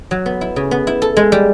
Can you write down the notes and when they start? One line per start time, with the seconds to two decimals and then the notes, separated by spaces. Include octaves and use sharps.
0.11 F#3
0.26 B3
0.41 E4
0.56 C#3
0.71 B3
0.87 E4
1.02 A4
1.17 G#3
1.32 G3